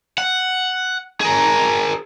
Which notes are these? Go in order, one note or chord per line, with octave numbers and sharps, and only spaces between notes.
F#5
G#4 A#4